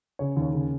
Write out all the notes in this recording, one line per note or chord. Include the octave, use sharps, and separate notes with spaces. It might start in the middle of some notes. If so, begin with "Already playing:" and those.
C#3 C#5
D#2
C#5
C#3